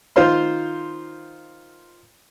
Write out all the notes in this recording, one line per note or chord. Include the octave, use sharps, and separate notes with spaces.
D#3 F4 C5 F5 C6